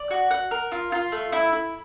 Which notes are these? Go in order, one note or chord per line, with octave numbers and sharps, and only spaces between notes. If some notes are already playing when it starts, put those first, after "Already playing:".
Already playing: D5
F#4
F#5
A#4
F4
F4
A3
E4
E4